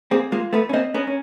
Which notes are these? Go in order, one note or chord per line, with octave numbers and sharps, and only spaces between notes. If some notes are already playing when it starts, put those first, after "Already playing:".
A#3 C4 G#4
G#3 A#3 F4
A3 B3 B4
C#4
A#3 C4 D#5
B3 C#4 A#4
C#4